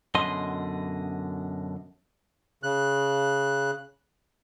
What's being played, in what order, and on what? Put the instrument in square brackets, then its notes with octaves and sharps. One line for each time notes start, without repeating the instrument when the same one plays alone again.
[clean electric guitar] F#2 B2 D3 D#5 C6
[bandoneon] C#3 F#6